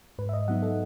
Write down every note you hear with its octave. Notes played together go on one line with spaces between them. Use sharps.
G#2 B4
E5
D#5
F#3 B3 D#4 F#5
A4